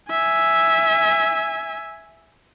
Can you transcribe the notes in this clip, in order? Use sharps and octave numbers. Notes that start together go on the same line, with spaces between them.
E5 G#5